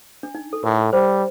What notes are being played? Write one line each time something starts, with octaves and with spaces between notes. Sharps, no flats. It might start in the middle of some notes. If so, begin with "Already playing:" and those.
D4
D#4
A4
A2 A#4
G3 C5